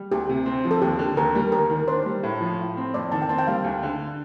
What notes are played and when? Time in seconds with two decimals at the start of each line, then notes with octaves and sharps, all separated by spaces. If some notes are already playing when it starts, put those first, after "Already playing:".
Already playing: G3
0.12 D2 G4
0.29 C3
0.46 C4
0.65 F3
0.71 A4
0.82 D#2 G4
0.99 D3
1.17 D#2 A#4
1.35 G3
1.52 D#2 A#4
1.70 D#3
1.88 D4 C5
2.06 G3
2.23 A2
2.41 F3
2.59 A2
2.77 C4
2.94 F2 D5
3.12 D#3 A5
3.22 G5
3.29 C4 A5
3.38 G5
3.47 G3 F5
3.64 D2
3.83 D3